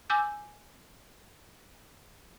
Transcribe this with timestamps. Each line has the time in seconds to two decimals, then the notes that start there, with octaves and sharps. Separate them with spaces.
0.10 G#5 D6 E6 G6